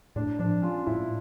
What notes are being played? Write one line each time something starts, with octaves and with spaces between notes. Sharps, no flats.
A2 D4
F3 D4
C#4 F4
A2 E4